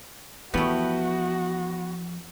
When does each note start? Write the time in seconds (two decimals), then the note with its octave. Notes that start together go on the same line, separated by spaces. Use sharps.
0.54 E2 F3 A3 B3 F#4 G4 B4